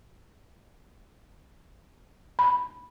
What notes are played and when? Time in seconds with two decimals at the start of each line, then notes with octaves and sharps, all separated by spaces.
2.39 B5